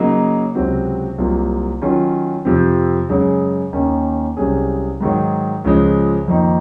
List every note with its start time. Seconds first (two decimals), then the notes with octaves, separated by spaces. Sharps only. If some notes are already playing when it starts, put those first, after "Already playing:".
Already playing: C#3 F#3 A#3 D#4
0.55 C#2 C3 F#3 C4 F#4
1.18 C2 C3 F#3 A#3 F4
1.82 D#3 F#3 C#4 F4
2.45 F2 C3 F3 C4
3.09 F#2 C#3 G#3
3.73 D#2 D#3 A#3 C#4
4.37 C2 C3 F#3 C#4 G#4
5.01 G#2 D#3 F#3
5.64 C#2 C#3 F3 G#3
6.28 F2 D#3 A#3 D#4